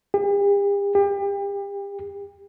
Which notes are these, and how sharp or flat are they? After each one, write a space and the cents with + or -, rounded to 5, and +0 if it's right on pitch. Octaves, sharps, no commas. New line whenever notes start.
G4 +45
G4 +35